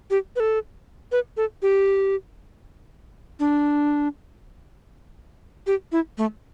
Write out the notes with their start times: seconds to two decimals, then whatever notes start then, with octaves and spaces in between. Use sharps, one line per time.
0.10 G4
0.36 B4
0.40 A4
1.12 B4
1.37 A4
1.62 G4
3.40 D4
5.67 G4
5.92 E4
6.18 A3